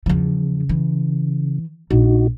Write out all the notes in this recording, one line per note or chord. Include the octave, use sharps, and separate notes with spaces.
E2 C#3 F3
E3
A#1 D#4 F#4